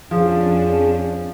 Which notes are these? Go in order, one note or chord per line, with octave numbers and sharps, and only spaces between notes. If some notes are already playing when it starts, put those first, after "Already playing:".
F2 F3 C#4 D4 G#4